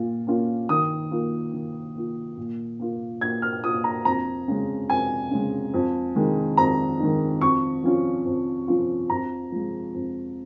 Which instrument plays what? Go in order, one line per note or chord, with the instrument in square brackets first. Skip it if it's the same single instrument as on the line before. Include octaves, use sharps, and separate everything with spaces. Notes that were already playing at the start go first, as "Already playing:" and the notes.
Already playing: [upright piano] A#2 F4
A#3 C#4 F4
D#3 D#6
A#3 F4
D#3
A#3 F4
A#2
A#3 F4
A#2 G#6
F6
A#3 F4 D#6
A#5
F2 A#5
C#3 G#3
F2 G#5
C#3 G#3
F2
D#3 G#3 D#4
F2 A#5
D#3 G#3 D#4
F2 C#6
F3 C#4 F4
F2
F3 C#4 F4
F2 A#5
F3 G#3
F2